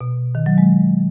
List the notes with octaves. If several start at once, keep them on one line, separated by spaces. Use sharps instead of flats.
B2
D#3
F#3
G#3